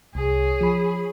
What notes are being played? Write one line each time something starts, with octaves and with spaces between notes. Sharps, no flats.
C2 G#4 C#5
F3 B5